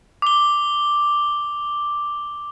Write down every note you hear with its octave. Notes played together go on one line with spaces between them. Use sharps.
D6 G7